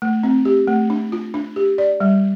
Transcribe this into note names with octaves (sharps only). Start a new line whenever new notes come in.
A3
C4
G4
A3
D4
F4
D4
G4
D5
G3